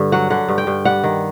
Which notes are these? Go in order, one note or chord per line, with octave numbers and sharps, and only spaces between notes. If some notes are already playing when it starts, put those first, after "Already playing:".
Already playing: G2 D3
F#3 F#5
D3 F#5
G2
G5
G2
G3 F#5
D#3